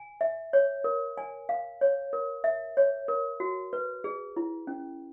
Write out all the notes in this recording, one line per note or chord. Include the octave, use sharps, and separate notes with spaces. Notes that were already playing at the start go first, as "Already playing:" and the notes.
Already playing: G#5
E5
C#5
A#4
G#5
F5
C#5
A#4
E5
C#5
A#4
F#4
B4
G#4
E4
C#4